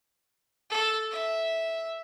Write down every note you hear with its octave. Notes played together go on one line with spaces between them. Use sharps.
A4
E5